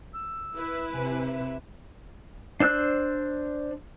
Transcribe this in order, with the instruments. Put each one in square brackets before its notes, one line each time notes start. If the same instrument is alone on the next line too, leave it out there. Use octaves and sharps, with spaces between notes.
[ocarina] E6
[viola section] E4 B4
[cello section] C3 [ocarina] G#5
[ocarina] E5
[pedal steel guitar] D4 C5 E6 F#6